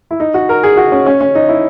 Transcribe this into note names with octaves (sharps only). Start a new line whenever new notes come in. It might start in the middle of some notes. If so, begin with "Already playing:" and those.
E4
D#4
F#4
A#4
G#4
F#4
C#4
C#4
C#4
D#4
E4